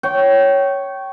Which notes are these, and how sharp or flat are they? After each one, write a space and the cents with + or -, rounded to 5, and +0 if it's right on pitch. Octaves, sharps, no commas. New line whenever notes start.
C#5 +0 G5 -25